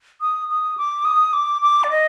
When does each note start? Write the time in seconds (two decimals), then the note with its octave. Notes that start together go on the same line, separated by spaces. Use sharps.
0.21 D#6
0.49 D#6
0.78 D6
1.05 D#6
1.33 D6
1.62 D6
1.84 D5
1.90 D#5